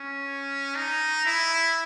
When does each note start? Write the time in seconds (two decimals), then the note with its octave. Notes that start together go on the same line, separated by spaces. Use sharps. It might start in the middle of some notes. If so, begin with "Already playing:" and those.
Already playing: C#4
0.75 D#4
1.26 E4